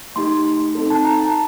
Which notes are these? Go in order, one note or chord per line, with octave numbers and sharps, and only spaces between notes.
A3 D#4 G4 C6
C4 D#4 A4
A5
A#5
A5